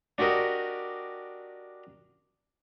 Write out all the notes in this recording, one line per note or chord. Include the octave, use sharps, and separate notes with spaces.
D4 F#4 G4 A#4 D#5